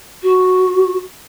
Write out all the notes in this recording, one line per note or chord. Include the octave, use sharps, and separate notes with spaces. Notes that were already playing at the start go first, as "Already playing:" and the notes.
F#4